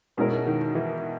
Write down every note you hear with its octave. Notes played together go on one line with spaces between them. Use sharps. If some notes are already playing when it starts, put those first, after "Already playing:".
B2 G#3 C#4 E4 A#4
D#3
E3